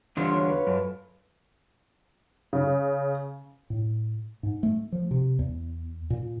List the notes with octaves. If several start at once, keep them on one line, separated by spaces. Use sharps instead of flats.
E2 D3 G3 F4 C5
F#4 C#5
B4
F#2 A4
C#3
A2
G#2
A3
F3
C3
E2
A#2